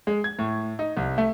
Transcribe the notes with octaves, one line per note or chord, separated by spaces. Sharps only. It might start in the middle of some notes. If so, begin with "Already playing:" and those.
G#3
G#6
A2
D#4
C2
A3